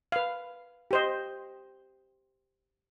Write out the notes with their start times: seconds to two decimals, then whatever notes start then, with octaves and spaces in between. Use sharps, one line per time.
0.12 B4 F5
0.91 G4 C5 D#5